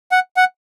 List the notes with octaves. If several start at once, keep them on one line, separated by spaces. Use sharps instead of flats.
F#5
F#5